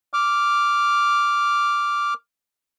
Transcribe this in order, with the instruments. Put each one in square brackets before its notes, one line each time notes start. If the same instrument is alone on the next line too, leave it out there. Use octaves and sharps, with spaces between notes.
[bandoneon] D6 F6